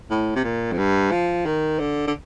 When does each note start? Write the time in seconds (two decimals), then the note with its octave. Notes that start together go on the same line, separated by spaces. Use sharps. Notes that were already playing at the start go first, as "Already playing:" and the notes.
0.11 A2
0.36 C3
0.44 A#2
0.72 F2
0.78 G2
1.11 F3
1.46 D#3
1.79 D3
2.07 D3